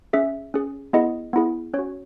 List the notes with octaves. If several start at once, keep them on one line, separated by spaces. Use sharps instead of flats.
C#4 G#4 E5
C#4 G#4
B3 E4 G#4 D#5
B3 E4 G#4
C#4 C#5
F#4